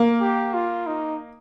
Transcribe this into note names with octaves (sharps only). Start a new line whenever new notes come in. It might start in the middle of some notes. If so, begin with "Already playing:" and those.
Already playing: A#3
G4
F4
D#4